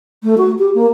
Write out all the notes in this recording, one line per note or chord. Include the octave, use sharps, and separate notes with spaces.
A3
F#4
G4
A#3